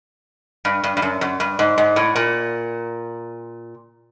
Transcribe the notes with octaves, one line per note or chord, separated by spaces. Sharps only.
G2
G2
G2
F#2
F#2
G2
G#2
G#2
A2
A#2